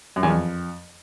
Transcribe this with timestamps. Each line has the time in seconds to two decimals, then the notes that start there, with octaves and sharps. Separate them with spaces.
0.16 F#2
0.23 E2
0.30 F2